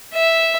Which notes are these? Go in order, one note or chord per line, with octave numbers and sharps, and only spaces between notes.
E5